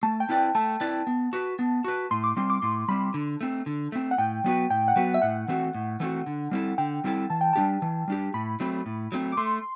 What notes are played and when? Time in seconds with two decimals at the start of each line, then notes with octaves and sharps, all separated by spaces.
0.03 A3 A5
0.20 G5
0.29 C4 E4 B4 D5
0.38 G5
0.55 A3 A5
0.80 C4 E4 B4 D5
1.07 B3
1.33 F#4 B4
1.58 B3 A5
1.84 F#4 B4
2.11 A2 C6
2.24 D6
2.37 G3 C4 C6
2.50 D6
2.62 A2 C6
2.88 G3 C4 B5
3.14 D3
3.41 A3 C4
3.66 D3
3.92 A3 C4
4.11 F#5
4.18 A2 G5
4.44 F#3 B3 F#4 B4
4.70 A2 G5
4.88 F#5
4.96 F#3 B3 F#4 B4
5.14 E5
5.22 A2 F#5
5.48 E3 A3 C4 F#4
5.75 A2
6.00 E3 A3 C4 F#4
6.26 D3
6.51 G3 C4 E4 A4
6.78 D3 G5
7.04 G3 C4 E4 A4
7.30 E3 A5
7.41 G5
7.53 G3 D4 G4 A5
7.82 E3
8.08 G3 D4 G4
8.34 A2 B5
8.60 F#3 A3 C4
8.86 A2
9.12 F#3 A3 C4
9.32 D6
9.37 A3 C6